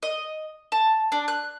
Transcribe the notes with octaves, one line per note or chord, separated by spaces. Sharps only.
D#5
A5
D4
F#6